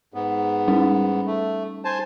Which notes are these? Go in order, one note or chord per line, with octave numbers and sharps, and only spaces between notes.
G#2 B3
G3 C#4 D#4
A3
C5 G#5 A5